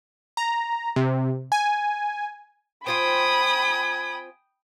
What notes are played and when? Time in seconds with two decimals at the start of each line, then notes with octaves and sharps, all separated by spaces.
0.37 A#5
0.96 C3
1.52 G#5
2.87 C4 F4 C5 G5 G#5 B5 D#6